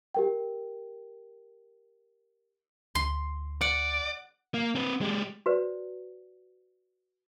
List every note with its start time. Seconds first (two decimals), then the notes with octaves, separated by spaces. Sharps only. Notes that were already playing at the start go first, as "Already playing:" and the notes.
0.14 G4 A#4 G5
2.95 D2 C6
3.61 D5 F#5
4.54 A#3
4.75 C4 B4
5.01 G#3 G4
5.46 F#4 B4 C5 D5